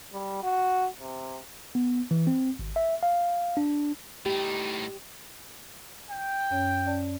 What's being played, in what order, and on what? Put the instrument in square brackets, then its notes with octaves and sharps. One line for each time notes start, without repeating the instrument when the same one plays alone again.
[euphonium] G3
F#4
C3
[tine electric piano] B3
E3
C4
G#1
E5
F5
D4
[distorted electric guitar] A2 D#4 [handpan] G4
[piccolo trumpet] G5
[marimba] F#2 C#4 C#5
C#4 D5 A5